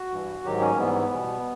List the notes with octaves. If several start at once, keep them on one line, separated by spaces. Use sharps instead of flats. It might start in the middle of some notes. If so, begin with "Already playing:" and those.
Already playing: F#4
G2 E3 G3
G#2 D#3 F#3 G4
C#4
A#3
G#2 E3 G3 B3
B2 G3